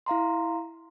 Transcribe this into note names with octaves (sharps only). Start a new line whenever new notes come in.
E4 F5 A#5 C6